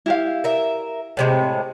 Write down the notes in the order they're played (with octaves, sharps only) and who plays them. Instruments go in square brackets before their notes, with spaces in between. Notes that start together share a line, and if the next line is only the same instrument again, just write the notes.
[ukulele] E4 G4 F5
[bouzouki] A#4 E5
A2 C3 G#3